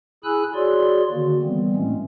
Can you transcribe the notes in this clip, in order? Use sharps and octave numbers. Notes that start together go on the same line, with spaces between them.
E4 G#4 G#5 B5 E6 F#6
F#4 G#4 C#5 D5 C6
D3 D#3 A#3 F#4
E3 G3 B3 C4
A2 G#3 A3 C#4